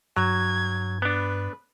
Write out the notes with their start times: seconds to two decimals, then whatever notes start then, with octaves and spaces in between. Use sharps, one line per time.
0.17 G2 F#3 G#6
1.02 B3 D4 B4